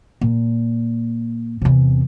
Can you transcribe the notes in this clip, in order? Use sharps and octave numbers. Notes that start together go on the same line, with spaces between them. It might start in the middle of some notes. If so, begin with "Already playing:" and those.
A#2
E2 C3